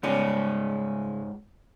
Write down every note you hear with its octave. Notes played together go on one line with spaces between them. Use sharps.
G#2 C#3 G3 G#3 C#5